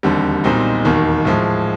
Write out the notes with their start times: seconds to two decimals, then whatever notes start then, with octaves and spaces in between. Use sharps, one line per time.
0.03 E1 D#2 D3 G3 C4
0.44 B1 A#2 G3 C4 D#4
0.85 E1 D#2 D#3
1.25 A2 F3 G#3